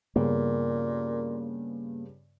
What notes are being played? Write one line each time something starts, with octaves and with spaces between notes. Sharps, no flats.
G2 A#2 C#3 A#3 B3